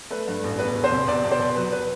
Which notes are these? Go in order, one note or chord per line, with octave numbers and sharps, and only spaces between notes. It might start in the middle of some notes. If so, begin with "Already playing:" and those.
A3 B4
G2
A1
E1 B4
E1
C5
C3
E2 D5
B2
C5
B2
F#3 B4
B4